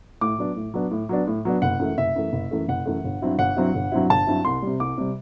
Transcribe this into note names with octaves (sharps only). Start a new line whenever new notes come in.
A2 D6
F#3 B3 D4
A2
F#3 B3 D4
A2
F#3 B3 D4
A2
F#3 B3 D4
F#1 F#5
F#2 E3 A3
F#1 E5
F#2 E3 A3
F#1
F#2 E3 A3
F#1 F#5
F#2 E3 A3
G1
G2 F#3 C4 E4
G1 F#5
G2 F#3 C4 E4
G1
G2 F#3 C4 E4
G1 A5
G2 F#3 C4 E4
C2 C6
C3 G3
C2 D6
C3 G3